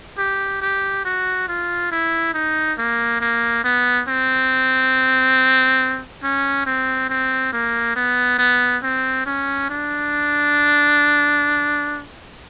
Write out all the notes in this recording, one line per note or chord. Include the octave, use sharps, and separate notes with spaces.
G4
G4
F#4
F4
E4
D#4
A#3
A#3
B3
C4
C#4
C4
C4
A#3
B3
B3
C4
C#4
D4